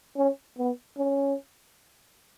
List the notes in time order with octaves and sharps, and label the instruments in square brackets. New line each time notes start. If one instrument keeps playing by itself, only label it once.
[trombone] C#4
B3
C#4